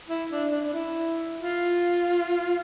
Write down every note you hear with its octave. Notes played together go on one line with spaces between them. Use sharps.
E4
D4
D4
D4
E4
F4